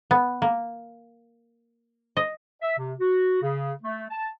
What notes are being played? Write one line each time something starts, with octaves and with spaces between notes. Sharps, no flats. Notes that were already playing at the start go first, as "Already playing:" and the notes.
B3
A#3
D#5
E5
C3
F#4
C#3
A3
A5